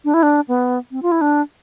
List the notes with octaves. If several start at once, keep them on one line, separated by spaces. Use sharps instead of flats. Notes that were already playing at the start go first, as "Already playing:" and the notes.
D4
E4
D4
B3
C4
F4
E4
D4